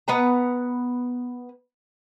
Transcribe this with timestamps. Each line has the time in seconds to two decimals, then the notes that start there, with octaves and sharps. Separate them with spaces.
0.08 B3 B4 F#5 A#5